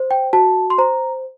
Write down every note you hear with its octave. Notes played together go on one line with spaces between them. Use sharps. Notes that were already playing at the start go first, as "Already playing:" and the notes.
Already playing: C5
G5
F#4 A5
C6
C5 A#5